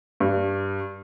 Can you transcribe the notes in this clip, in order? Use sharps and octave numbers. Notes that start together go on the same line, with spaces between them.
G2